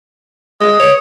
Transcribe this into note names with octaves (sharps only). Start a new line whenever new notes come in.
G#3 D#6
C#5